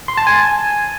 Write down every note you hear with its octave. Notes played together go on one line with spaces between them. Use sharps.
C6
A5
G#5